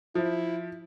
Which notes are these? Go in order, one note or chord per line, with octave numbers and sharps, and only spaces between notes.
F3 E4